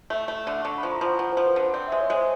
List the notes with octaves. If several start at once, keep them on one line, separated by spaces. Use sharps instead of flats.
A3
A3
D3
D3 C#6
B5
F3
A#5
F3 F#5
F3 F#5
C5
F3
B4
D3 C5
C4 D5
E5
G#3
C#5
G#3 C5